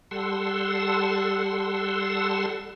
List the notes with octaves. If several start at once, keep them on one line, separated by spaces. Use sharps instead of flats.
G3 A4 F#5 C6 E6